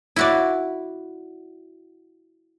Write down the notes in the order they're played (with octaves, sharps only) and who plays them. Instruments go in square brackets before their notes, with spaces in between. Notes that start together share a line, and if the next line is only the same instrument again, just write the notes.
[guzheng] E4 F#4 D5